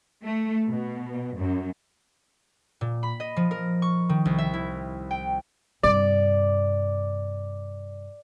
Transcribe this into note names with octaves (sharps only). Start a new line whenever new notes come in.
A3
B2
F#2
A#2
B5
D#5
F3
A#4
C#6
D#3
C2
E5
E4
G5
G2 C3 D5